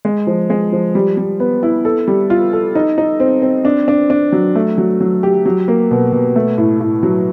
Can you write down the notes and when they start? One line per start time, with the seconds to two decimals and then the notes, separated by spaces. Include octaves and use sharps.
0.05 G#3
0.27 F3
0.50 G#3
0.72 F3
0.95 G3
1.17 G3
1.40 B3
1.63 E4
1.85 A4
2.08 G3
2.30 F4
2.53 A4
2.75 D#4
2.98 D#4
3.20 C4
3.42 C4
3.65 D4
3.88 D4
4.10 D4
4.32 F#3
4.55 A3
4.78 F#3
5.00 F#3
5.23 G4
5.46 F#3
5.68 A#3
5.91 B2
6.12 B2
6.36 A3
6.58 A2
6.80 A2
7.03 F#3